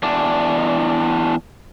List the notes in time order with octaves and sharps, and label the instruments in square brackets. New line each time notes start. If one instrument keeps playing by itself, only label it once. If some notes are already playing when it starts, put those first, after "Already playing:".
[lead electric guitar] E2 D4